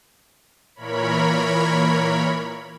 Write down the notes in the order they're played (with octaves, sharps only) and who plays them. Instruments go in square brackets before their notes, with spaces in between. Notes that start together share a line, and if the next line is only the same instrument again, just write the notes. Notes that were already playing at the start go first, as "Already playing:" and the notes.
[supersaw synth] A#2 E3 A#4 C#5 B5